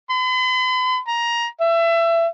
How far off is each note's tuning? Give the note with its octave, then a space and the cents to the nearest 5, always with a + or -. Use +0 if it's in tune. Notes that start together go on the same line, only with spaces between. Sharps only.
B5 +45
A#5 +15
E5 +25